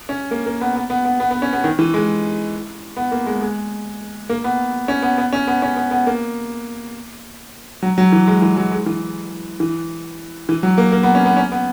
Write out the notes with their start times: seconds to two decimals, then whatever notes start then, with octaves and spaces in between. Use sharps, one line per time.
0.09 C#4
0.31 A#3
0.46 A#3
0.61 B3
0.75 B3
0.90 B3
1.05 B3
1.20 B3
1.31 B3
1.42 C#4
1.53 B3
1.64 D#3
1.79 E3
1.94 G#3
2.97 B3
3.12 A#3
3.26 G#3
3.41 G#3
4.30 A#3
4.44 B3
4.88 C#4
5.02 B3
5.18 B3
5.33 C#4
5.47 B3
5.62 C#4
5.77 B3
5.91 B3
6.07 A#3
7.82 F#3
7.98 F#3
8.12 E3
8.27 G#3
8.42 E3
8.57 F#3
8.72 G#3
8.86 E3
9.60 E3
10.49 E3
10.63 F#3
10.78 A#3
10.92 A#3
11.03 B3
11.15 C#4
11.26 B3
11.37 C#4
11.52 B3